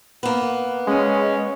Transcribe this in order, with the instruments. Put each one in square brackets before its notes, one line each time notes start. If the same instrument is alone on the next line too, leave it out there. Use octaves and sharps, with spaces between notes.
[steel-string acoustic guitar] A#3 B3
[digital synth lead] G#3 [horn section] C#4